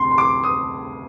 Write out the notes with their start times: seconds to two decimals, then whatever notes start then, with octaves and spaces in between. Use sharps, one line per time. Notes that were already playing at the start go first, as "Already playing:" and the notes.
Already playing: D2 C3 C6
0.11 C6
0.18 D6
0.44 D#6